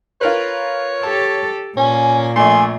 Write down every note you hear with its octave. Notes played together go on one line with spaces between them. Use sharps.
F4 A#4 B4 C#5
G4 A4 A5
A#2 C#4 G#5
A#1 A3 G#5 C6